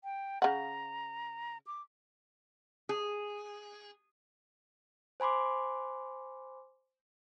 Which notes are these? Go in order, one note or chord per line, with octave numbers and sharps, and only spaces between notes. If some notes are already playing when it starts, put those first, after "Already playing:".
G5
C#3 F#5 A#5
D6
G#4
C5 G#5 B5 C6 D6